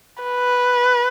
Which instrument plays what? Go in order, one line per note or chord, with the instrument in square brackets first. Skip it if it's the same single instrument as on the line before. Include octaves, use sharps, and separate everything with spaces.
[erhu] B4